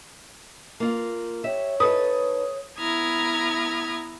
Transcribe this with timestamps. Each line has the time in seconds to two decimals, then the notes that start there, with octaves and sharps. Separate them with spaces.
0.80 A#3 F4
1.44 G4 C#5 E5
1.80 D#4 A4 B4 D#6
2.79 B3 E4 A#5 D#6 F6 G#6